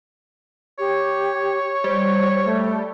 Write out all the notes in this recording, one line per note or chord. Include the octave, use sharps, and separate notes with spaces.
G4 C#5
G3 C5
A3